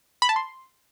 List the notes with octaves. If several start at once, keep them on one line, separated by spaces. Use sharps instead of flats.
B5
A5
C6